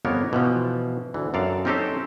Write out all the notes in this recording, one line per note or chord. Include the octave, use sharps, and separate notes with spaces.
G1 F2 A#3 B3 A#4 C#5
B2 E3 F3
D2 E3
F#2 A4 D5 F5
C4 C#4 D#4 G4 A4 C5